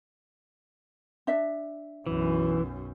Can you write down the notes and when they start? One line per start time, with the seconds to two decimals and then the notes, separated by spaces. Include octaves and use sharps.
1.27 D4 E5
2.06 B1 F#2 E3